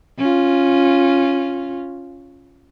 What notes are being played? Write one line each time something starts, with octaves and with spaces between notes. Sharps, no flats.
C#4 F4